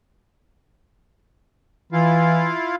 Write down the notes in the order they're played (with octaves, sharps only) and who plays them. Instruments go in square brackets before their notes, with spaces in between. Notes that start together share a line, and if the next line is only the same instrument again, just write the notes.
[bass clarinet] E3 [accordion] E4 F4 F5